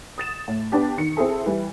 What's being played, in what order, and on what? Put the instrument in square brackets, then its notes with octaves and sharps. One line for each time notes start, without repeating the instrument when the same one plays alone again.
[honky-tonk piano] D#6 A6 E7
A2
B3 D4 G4
D#3 C#7
C4 E4 G#4 A4
E3 G3